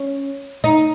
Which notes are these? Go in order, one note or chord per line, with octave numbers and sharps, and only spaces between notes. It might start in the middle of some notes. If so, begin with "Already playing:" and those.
Already playing: C#4
D#4